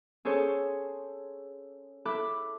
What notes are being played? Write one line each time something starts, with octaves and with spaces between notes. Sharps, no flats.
C#4 G#4 A4 C5 C#5 A5
E4 A4 B5 D6 F#6